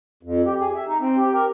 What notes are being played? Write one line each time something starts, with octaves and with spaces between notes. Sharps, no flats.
F2
G4
G#4
E5
D#4
C4
G4
A#4